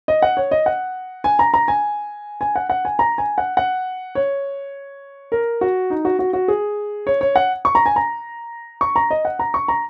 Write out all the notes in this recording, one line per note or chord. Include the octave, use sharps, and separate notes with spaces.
D#5
F#5
C#5
D#5
F#5
G#5
A#5
A#5
G#5
G#5
F#5
F#5
G#5
A#5
G#5
F#5
F#5
C#5
A#4
F#4
D#4
F#4
F#4
F#4
G#4
C#5
C#5
F#5
C#6
A#5
G#5
A#5
C#6
A#5
D#5
F#5
A#5
C#6
A#5